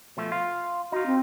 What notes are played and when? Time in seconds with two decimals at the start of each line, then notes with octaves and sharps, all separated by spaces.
0.17 B2 F3 A3
0.32 F4
0.92 D#4 F4 F#4
1.06 C4